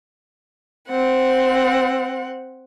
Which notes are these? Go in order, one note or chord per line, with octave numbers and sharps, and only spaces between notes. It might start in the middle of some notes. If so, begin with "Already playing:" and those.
C4 C5 F#5